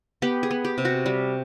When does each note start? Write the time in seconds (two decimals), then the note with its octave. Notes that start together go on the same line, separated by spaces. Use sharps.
0.22 B3 G4
0.43 G#4
0.51 B3
0.65 G4
0.78 C3
0.85 F#4
1.06 G3